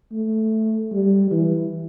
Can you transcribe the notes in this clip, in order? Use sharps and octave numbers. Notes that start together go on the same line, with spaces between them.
A3
G3
E3